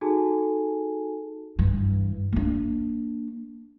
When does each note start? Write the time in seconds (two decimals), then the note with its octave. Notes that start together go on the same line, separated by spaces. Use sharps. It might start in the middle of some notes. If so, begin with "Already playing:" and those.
0.01 D#4 F#4 G#4 A4 G#5 A5
1.59 G2 E3
2.33 A#3 D4